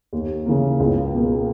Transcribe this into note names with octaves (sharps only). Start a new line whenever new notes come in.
D#2
C#3 E3 A#3
C#2
B2 A#3